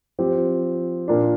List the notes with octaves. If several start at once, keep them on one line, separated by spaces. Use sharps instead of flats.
F3 C4 G4
A#2 A#3 D4